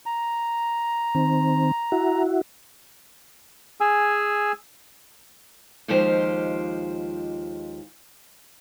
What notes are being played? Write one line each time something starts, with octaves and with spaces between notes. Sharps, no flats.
A#5
D#3 C4
E4 F#4
G#4 G#5 E6
D#2 F3 G#3 F4 G4 C5